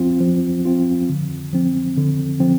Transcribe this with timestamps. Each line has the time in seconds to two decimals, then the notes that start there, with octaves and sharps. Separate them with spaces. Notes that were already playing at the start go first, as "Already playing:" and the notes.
Already playing: F3 C4 F4
0.20 F3
0.65 C4 F4
1.09 D3
1.53 F3 C4
1.97 D3
2.40 F3 C4